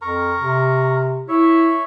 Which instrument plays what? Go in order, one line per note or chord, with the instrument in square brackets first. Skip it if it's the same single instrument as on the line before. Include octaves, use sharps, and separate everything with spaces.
[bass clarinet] F2 [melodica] A#4 A#5 C#6
[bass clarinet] C3
[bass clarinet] E4 [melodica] C#5 E5